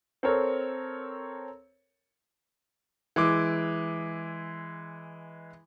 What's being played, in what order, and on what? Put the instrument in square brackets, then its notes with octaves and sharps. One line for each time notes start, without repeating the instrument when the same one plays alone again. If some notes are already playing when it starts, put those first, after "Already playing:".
[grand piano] C4 A4 A#4 C#5
E3 G#3 D6